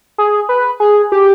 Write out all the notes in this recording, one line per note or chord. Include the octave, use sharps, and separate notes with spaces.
G#4
B4
G#4
G4